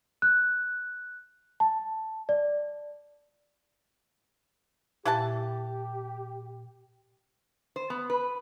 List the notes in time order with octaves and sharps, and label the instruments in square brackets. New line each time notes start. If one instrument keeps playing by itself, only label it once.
[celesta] F#6
A5
D5
[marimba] A#2 [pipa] E4 F#5 A5 [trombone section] G4
[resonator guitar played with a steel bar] C5
B3
B4